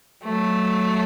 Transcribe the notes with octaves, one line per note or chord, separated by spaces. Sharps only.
F#3 A3